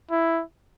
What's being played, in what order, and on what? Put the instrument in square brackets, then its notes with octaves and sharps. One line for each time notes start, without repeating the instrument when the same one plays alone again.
[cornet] E4